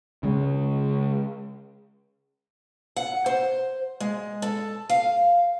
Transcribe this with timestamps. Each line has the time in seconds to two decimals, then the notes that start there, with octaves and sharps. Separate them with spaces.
0.23 C#3 G#3
2.96 F#5
3.26 C5
4.00 G#3
4.42 A4
4.89 F5